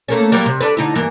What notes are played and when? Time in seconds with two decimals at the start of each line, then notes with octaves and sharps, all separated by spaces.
0.08 A3 A#3 C#4
0.32 F#3 G3 A#3
0.46 C3
0.61 D4 A4 B4
0.77 D3 D#4 E4
0.95 G2 E3 A#3